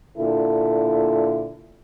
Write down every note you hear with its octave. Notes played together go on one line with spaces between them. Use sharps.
A#2 D3 E4 A4